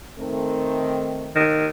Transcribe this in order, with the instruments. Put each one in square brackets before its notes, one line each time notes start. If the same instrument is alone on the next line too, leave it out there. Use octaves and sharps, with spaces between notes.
[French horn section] D#3 A3 C4
[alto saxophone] D#3